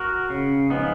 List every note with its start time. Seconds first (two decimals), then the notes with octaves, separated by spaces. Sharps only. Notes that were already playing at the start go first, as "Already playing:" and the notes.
Already playing: F#4 A#4
0.30 C#3
0.70 F3 G#3 B3 D#4